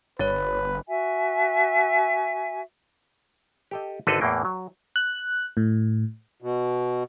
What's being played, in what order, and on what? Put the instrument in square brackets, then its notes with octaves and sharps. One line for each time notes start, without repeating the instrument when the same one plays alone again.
[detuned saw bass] G1 [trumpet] B4 [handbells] C#5 A6
[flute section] F#4 E5 G#5
[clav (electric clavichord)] G4 A4 D#5
G#1 D3 C4 A4 B4 D#5
E2 A2 E3 A#3 G5
F#3
[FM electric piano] F#6
A2
[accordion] B2